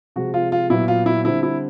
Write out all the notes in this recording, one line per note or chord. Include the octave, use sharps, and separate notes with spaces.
C3 F3 G#3 F#4
F4
F4
A#2 F#3 B3 E4
F4
E4
D3 G3 C4 E4
E4